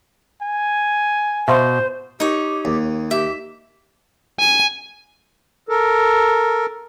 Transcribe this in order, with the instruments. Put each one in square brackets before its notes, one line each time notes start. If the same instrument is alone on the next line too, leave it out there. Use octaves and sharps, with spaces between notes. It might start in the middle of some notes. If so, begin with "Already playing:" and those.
[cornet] G#5
[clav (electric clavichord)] B2 [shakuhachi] C5 [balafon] E5 F5 C6
[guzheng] D#4 C#5 [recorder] G4
[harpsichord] D#2
[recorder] G4 [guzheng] E5
[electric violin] G#5
[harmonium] A4 A#4